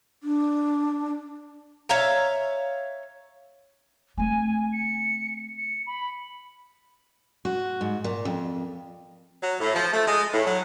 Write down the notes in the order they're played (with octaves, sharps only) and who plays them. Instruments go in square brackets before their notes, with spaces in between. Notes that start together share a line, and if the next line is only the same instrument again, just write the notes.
[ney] D4
[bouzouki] C#5 E5 F5 A#5
[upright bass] A3 C4 [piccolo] G#5
[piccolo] C#7
C#7
B5
[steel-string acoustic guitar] F#4
G#2
A#2
F2
[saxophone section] F#3
A2
F3
A3
G#3
A2
F#3